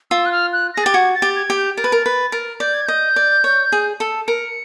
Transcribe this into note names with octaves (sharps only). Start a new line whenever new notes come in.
F4 E6
F#6
F6
F#6
G#4 A#6
G4 A6
F#4 G#6
A6
G4
G#6
G4
G6
A#4 A6
B4
A#4
B4
A#4
D5 G6
G#6
D#5 G6
D5
C#5
G#4
A4
A#4 C#7